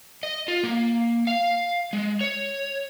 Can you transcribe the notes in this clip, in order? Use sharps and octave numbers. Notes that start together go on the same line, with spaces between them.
D#5
F4
A#3
F5
G#3
C#5